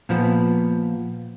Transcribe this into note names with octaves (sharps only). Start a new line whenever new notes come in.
A#2 F3 B3